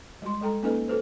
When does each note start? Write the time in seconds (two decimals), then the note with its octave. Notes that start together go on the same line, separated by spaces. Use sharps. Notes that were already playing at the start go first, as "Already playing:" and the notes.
0.22 G3 G#3 F#4 C6
0.41 G#3 A4 G5 A#5
0.63 A#3 C#4 D#4 A4 B4 D#5
0.88 F#4 A4 B4 C5